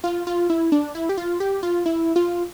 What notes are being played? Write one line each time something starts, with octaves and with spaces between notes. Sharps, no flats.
F4
F4
E4
D4
E4
G4
F4
G4
F4
E4
F4